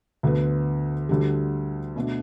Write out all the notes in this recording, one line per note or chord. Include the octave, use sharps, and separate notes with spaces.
D2 D3 B3
D2 D3 G3
B2 A3 D4